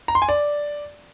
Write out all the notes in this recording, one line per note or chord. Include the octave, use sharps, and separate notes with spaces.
A#5
C6
G#5
D5